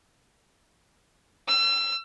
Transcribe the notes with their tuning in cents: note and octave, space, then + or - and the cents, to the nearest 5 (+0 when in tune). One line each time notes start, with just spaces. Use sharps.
E6 +40